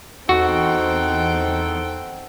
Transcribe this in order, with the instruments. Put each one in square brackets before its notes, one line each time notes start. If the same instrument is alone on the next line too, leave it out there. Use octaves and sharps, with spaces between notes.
[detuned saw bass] E2 [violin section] C4 G5 [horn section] D#4 A4 F#5 [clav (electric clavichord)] F#4